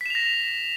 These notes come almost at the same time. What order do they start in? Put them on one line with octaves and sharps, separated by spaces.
B6 E7 F7 A#6